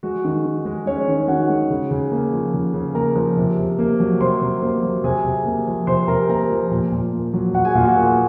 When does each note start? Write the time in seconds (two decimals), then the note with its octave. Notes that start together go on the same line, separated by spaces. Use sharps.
0.03 G#3 F#4
0.25 D#3
0.45 D#3
0.65 G#3
0.86 G#3 C#4 C#5
1.08 D#3
1.28 D#3 F#4 F#5
1.49 G#3
1.70 C#3
1.91 C#3
2.12 A#3
2.33 F3
2.54 C#3
2.74 C#3
2.95 A#3 A#4 A#5
3.16 F3
3.37 C3
3.58 C3
3.79 A#3
4.00 F#3
4.20 C3 C5 C6
4.41 C3
4.62 A#3
4.83 F#3
5.04 C3 G#4 G#5
5.24 C3
5.45 A#3
5.67 F3
5.87 C3 C5 C6
6.08 C3 A#4 A#5
6.29 A#3 A#4 A#5
6.50 F3
6.71 A#2
6.92 A#2
7.13 A#3
7.34 F#3
7.54 A#2 F#4 F#5
7.65 G#4 G#5
7.75 A#2 F4 F5
7.85 F#4 F#5
7.96 A#3 G#4 G#5